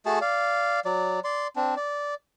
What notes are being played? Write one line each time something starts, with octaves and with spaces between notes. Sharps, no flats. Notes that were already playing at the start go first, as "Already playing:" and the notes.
A3 F#4 G#4 A5
D5 F5
F#3 D5
D5 C6
C4 D4
D5